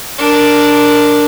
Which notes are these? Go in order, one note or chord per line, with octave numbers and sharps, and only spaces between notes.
D4 A#4